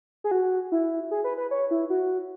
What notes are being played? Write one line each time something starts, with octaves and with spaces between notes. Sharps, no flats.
G#4
F#4
E4
G#4
B4
B4
C#5
E4
F#4